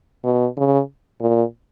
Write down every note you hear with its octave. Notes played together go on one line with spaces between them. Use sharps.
B2
C#3
A#2